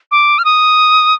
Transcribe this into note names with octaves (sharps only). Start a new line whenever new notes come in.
D6
F6
D#6